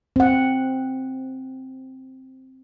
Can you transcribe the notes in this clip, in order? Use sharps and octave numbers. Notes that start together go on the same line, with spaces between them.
C4 F#5